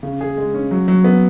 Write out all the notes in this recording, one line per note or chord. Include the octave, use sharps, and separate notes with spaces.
C#3
G#4
G#3
C#4
F#3
F#3
B3